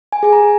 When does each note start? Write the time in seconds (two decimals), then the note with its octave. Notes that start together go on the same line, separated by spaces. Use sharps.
0.13 G#5
0.23 G#4 G#5
0.33 A#5